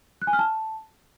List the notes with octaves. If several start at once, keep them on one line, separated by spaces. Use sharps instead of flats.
F#6
G#5
F6
A5